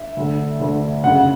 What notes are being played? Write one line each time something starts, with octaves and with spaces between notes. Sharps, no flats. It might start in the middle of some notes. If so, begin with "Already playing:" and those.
Already playing: E5
D2 D3
D2 D3
F#1 F#2 C#3 F#5